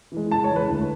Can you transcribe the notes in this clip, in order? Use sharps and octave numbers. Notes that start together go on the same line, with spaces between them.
E3 G#3
C#3 A5
C#5
E3 G#3
B4
D2